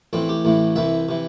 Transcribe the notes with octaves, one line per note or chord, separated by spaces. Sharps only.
A1 A2 E3 C4
G4
A1 A2 E3
C2 C3 E3 E5
C3 E3